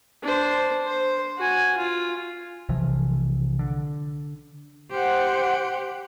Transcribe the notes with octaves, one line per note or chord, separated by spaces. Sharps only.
D4 C5
C5
F#4 G#5
F4
B1 C3 E3 F3
D3
G4 C5 F#5